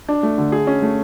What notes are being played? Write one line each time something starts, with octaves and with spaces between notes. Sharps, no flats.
D4
A3
D3
G#4
C#4
A3